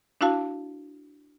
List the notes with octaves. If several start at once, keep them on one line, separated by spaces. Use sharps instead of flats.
D4 E4 F#4 F5 A5